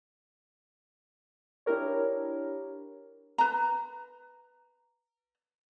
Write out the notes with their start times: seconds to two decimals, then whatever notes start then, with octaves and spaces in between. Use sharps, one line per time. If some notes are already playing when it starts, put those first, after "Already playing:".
1.66 D4 E4 G4 A#4 C#5
3.38 B4 A#5